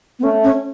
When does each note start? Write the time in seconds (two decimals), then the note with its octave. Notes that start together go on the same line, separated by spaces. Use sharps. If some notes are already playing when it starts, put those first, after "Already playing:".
0.19 B3
0.23 A3 C#4
0.44 C#4